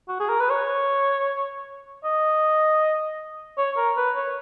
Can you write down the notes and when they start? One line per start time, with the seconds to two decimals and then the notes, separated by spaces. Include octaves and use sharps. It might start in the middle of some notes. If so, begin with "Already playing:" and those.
0.08 F#4
0.19 G#4
0.29 A#4
0.40 B4
0.50 C#5
2.04 D#5
3.58 C#5
3.77 A#4
3.97 B4
4.16 C#5